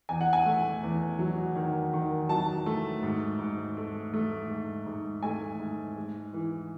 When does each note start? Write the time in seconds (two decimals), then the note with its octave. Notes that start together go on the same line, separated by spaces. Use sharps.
0.09 E2 G#5
0.21 F#5
0.33 G#5
0.46 A3
0.83 E2
1.19 F#3
1.55 D#3
1.93 D#3
2.29 F#3 A5
2.66 A3
3.03 G#2
3.39 G#2
3.77 A3
4.14 A3
4.49 G#2
4.86 G#2
5.23 A3 G#5
5.59 G#2
5.97 G#3
6.33 E3